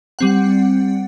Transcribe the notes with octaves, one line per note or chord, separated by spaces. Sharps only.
G3 C4 F#5